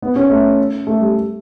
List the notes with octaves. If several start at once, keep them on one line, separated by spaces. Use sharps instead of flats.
B3
C#4
A3
A3
G3